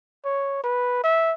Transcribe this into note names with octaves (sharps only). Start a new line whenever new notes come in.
C#5
B4
E5